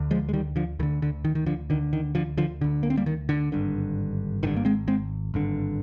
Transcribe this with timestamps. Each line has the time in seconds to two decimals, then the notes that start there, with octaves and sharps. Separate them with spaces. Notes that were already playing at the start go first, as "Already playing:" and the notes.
Already playing: D2 D3
0.11 F3 G#3
0.29 G#3
0.33 D#3 G3
0.56 D3 F3
0.79 D2 D#3
0.83 D3
1.02 D3
1.25 D#3
1.35 D#3
1.46 D3 F3
1.70 D3 D#3
1.73 D2
1.93 D#3
2.15 D3 F3
2.37 D3 F3
2.61 D2 D3
2.83 A#3
2.90 C4
2.97 G3 A#3
3.06 D#3
3.29 D3
3.52 G#1 G2 D3
4.43 G#1 G2 D3 D#3
4.57 A#3
4.65 G#3 C4
4.88 G#3 C4
5.34 G#1 G2 D3